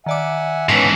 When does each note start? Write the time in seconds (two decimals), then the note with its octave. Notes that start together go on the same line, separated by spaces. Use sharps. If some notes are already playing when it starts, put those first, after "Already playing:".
0.06 D#3 D5 E5 F#5 G#5 D6
0.69 G#2 E3 B3 C#4 G#5 A5 C#6